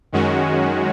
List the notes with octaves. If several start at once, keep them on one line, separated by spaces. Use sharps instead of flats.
F#2 D#3 G#3 C#4 F#4